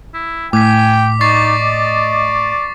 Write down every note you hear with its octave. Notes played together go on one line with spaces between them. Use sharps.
E4
A2 G5 G#5 D6 B6
D#4 D5 C#6 A6 C7
D#5